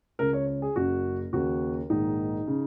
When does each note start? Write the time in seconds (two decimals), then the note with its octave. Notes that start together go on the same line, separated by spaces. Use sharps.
0.19 C#2 C#3 A#4
0.33 C#5
0.47 C#5
0.62 G#4
0.76 F#1 F#2 C#3 F#4
1.33 D#2 C#3 F#4
1.90 A#1 G#2 D#3 D#4
2.48 C#3